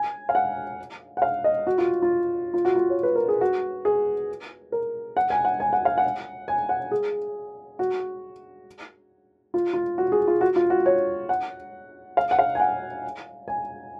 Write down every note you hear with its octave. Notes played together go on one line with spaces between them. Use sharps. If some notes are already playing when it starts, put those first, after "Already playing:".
Already playing: G#5
F5
F#5
F#5
F5
D#5
F#4
F4
F4
F4
F#4
F4
C#5
B4
A#4
G#4
F#4
G#4
A#4
F#5
G#5
F#5
G#5
F#5
F5
F#5
G#5
F#5
G#4
F#4
F4
F4
F#4
G#4
F4
F#4
F4
F#4
C#5
F#5
F5
F#5
F5
G#5
F#5
G#5